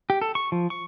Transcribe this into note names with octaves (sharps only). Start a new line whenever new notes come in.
G4
A4
C#6
F3
C#6